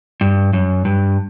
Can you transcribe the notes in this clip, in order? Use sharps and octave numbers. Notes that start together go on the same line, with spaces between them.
G2
F#2
G2